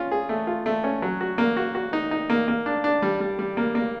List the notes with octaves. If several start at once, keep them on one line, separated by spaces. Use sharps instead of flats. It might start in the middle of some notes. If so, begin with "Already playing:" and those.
Already playing: C#4 F4
G#4
A3
F4
A3
C#4
F#3
F#4
A#3
F#4
F#4
D#4
D#4
A#3
A#3
D4
D4
G3
G3
G3
A#3
A#3